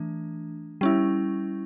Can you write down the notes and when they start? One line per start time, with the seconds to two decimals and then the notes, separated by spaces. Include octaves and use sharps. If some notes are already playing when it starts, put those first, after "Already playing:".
Already playing: E3 A3 D4
0.81 G3 C#4 E4